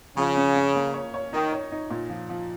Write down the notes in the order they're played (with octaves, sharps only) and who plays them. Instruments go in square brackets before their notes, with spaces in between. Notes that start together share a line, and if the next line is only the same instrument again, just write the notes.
[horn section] C#3 [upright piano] F3
[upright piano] C#4
C#4
A#3
C#5
C#5
[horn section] D#3 [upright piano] D#4
[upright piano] C#5
D#4
A#2
F3
F3